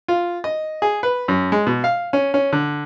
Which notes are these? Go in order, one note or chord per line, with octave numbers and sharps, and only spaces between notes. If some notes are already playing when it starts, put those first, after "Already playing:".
F4
D#5
G#4
B4
F#2
G#3
B2
F5
C#4
C#4
D3